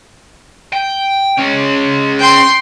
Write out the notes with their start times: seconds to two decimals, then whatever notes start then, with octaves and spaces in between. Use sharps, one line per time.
0.72 G5
1.39 G#3 C#4
2.19 G5 C6